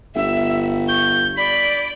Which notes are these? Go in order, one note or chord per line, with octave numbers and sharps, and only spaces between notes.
G1 E5
C#6 G6
D5 B5